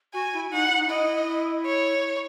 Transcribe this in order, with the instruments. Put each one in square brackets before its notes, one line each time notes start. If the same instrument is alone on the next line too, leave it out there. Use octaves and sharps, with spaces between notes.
[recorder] F#4 [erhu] G#5
[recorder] E4
[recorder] D#4 [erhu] F#5
[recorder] E4
D#4
[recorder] E4 [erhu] D#5
[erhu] C#5